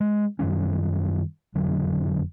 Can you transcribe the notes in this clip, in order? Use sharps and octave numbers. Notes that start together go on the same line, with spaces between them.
G#3
F#2 D#3 G3 C#4
F#1 F2 D3 F#3